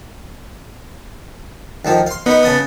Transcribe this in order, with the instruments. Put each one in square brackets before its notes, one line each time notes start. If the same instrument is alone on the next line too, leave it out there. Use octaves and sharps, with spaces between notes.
[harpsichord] D2 D#3 F3
F5 C6
[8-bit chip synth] B3 [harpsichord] D#4 B4
[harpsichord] C#3 A5 D#6